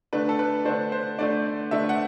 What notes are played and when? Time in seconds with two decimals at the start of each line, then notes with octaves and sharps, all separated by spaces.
0.13 D3 A3 D4 B4
0.29 A4
0.39 B4
0.65 D3 A3 D4 C5
0.92 C5
1.19 D3 A3 D4 D5
1.71 D3 A3 D4 E5
1.89 F#5